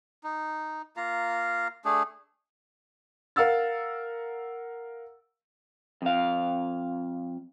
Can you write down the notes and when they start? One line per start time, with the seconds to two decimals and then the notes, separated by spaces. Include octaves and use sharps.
0.24 D#4
0.97 A#3 F4 F5 A#5
1.85 A3 D4 G#4
3.36 A#4 F5 F#5 E6 A6
6.02 F2 F5